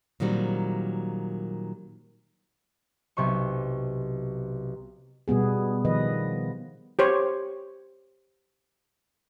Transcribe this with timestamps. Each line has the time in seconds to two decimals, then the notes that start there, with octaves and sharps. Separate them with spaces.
0.20 A#2 D#3 F#3 G3 C4
3.17 B1 C3 C#6
5.28 B2 G3 B3 G#4
5.85 D#3 F3 B4 D#5
6.99 G4 C5 C#5